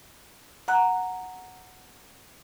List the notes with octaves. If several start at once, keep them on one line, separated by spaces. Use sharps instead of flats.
F#5 A#5 F#6